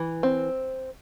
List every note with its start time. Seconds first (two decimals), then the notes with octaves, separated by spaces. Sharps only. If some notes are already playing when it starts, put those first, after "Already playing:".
Already playing: E3
0.23 C4